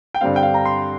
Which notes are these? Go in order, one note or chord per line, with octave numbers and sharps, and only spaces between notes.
G5
G2 D3 G3 C4 F5
G5
F5
A#5
C6